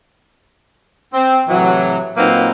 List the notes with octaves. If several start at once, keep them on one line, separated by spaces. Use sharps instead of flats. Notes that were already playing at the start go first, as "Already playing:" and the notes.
C4
A2 C3 E3 F#3
A#2 F#3 A#3 C4 D#4 B4